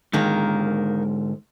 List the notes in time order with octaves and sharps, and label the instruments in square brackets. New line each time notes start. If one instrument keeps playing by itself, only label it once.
[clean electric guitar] G#2 D3 G#3 [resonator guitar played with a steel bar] D#3 A#3